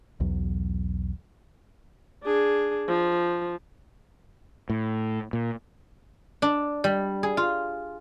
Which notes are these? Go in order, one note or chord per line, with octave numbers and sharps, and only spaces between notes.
B1 E2 F#3
D4 G#4
F3
A2
A#2
D4
G3
G#4
F4